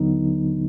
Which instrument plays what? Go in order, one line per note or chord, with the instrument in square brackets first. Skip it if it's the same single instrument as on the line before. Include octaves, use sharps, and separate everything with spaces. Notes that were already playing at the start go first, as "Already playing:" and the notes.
Already playing: [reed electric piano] D#2 D3 F#3 B3 D#4